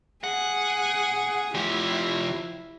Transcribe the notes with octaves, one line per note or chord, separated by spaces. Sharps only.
G#4 F#5
F3 E4 G4